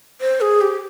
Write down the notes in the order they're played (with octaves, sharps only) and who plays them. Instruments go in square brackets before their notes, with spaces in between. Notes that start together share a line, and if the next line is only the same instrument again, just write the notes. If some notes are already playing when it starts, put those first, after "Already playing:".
[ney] C5
G#4
G4